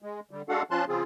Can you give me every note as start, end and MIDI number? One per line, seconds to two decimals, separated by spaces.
0.02 0.20 56
0.31 0.42 50
0.31 0.42 55
0.49 0.62 56
0.49 0.62 62
0.49 0.62 66
0.49 0.62 69
0.49 0.62 77
0.49 0.62 78
0.71 0.85 53
0.71 0.85 61
0.71 0.85 65
0.71 0.85 81
0.71 0.85 84
0.71 0.85 90
0.88 1.03 49
0.88 1.03 53
0.88 1.03 60
0.88 1.03 65
0.88 1.03 68